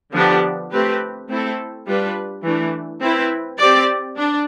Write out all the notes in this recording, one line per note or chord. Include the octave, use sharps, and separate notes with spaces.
D3 F3 B3 D4 G4
A3 C4 G4 B4
A3 C4 E4 A4
G3 D4 F4 B4
E3 A3 D4
C4 E4 B4
C4 G4 D5
D4